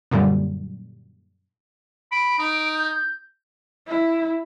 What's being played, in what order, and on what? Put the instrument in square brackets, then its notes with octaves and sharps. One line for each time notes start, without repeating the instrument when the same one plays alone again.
[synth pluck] F#2 A#2 D3 G3
[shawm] B5 [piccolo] D7
[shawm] D#4
[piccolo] G6
[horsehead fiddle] E4